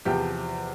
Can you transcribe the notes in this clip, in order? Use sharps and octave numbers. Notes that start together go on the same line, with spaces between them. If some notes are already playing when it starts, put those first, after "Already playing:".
E2 C3 F3 G4